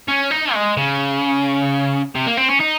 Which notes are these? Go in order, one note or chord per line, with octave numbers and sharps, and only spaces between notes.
C#4
D#4
G#3
C#3
C3
A#3
C4
C#4
D#4